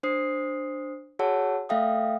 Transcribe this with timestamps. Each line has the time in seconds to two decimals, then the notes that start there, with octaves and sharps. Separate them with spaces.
0.03 D4 C5 D#6 C7
1.19 F#4 G#4 C#5 F#5 A5 E6
1.69 A3 A4 E5 F5 G5 D#6